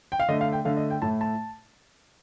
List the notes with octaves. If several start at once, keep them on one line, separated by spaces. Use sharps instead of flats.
G5
F5
D3 A3 D#5
F5
G5
D3 A3 F5
D#5
G5
A2 A3 A5
A5